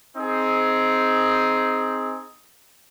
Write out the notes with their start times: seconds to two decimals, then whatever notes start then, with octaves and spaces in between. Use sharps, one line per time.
0.16 C4 D#4 G#4